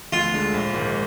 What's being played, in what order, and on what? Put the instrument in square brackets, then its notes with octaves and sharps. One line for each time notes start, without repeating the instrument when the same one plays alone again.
[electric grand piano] D2 [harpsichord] F4
[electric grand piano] D3 G#3
A#1
G#2 D#3